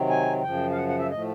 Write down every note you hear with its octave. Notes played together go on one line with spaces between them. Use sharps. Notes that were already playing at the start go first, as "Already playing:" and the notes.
Already playing: C3 D#3 F#3
G#5
F#2 C#3 F3 G5
F5
F#5
F#5
E5
A2 F3 A3 D#5